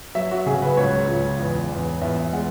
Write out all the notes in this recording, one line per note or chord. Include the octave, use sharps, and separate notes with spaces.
F#3 E5
F#4
C#3 G#4
B4
C#2 C#5
C#2
E2
E2
E2 E5
G#3 F#5